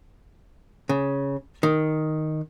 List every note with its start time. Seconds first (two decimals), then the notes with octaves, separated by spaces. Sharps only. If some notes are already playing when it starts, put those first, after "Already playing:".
0.89 C#3
1.63 D#3